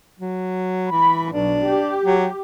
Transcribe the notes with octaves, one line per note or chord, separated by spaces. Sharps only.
F#3
E3 B5
B1 D4
G4
F#3